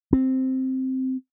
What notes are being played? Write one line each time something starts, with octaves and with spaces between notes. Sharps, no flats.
C4